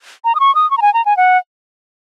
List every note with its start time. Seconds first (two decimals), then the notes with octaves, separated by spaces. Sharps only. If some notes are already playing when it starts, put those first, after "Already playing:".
0.25 A#5
0.35 D#6
0.40 C#6
0.55 D#6
0.71 C#6
0.77 A#5
0.82 G#5
0.94 A#5
1.05 G#5
1.17 F#5